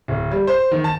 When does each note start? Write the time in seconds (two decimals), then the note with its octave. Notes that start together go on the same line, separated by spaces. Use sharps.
0.08 D1
0.31 G3
0.47 C5
0.71 D#3
0.84 A5